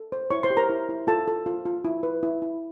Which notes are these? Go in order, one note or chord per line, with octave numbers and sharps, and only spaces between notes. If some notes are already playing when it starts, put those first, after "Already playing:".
Already playing: A4
C5
E4 C#5 C#6
C5 C6
G4
A#4 A#5
E4
E4
F4 A4 A5
A4
F4
F4
E4
B4
E4
E4